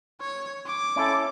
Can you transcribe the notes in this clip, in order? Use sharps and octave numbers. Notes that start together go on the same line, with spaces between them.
C#5
D6
C#4 E4 A4